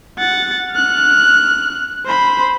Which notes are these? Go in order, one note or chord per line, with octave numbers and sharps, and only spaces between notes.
F#5 A6
F6 F#6
C5 B5